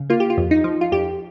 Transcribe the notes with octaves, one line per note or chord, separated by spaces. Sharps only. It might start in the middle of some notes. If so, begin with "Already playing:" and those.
Already playing: C#3
A#3 F4
G4
F4
F2
D#4
F3
F4
F2 G4